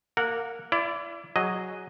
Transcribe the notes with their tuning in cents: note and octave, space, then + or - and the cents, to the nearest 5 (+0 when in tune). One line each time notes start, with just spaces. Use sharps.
A#3 +0 A#4 -20 F#5 -20
E4 +30 D5 -15
F#3 +0 G#4 +0 D#5 +0